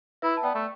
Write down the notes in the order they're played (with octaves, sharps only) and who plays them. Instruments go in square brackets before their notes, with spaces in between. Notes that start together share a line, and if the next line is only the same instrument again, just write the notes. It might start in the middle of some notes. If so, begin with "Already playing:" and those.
[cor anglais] E4 [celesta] B4 E5
[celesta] A5
[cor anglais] B3 [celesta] D5 G5
[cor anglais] A3